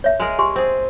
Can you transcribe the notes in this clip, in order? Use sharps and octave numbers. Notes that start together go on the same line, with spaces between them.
C#5 E5
G#3 G#4 A#4
G4 G#5 C6
C4 G#4